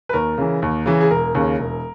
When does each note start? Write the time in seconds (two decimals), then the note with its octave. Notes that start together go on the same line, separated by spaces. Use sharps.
0.09 B4
0.13 D#2 A#4
0.38 C#3 E3
0.62 D#2
0.86 C#3 E3
1.01 G#4
1.11 E1 A#4
1.35 D#2 C#3
1.59 E1